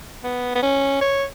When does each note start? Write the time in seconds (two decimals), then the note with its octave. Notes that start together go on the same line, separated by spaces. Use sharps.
0.24 B3
0.55 B3
0.63 C#4
1.01 C#5